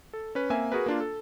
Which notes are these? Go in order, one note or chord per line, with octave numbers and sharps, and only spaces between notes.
A4
C#4 B4
A#3 C4 E5 G#5
F#4 G#4 A#4 B4
A#3 D4 F4
A4